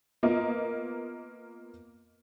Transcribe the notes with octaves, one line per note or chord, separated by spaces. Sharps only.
A#3 B3 F4 A#4 D#5